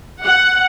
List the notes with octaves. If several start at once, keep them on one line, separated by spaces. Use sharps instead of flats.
F#5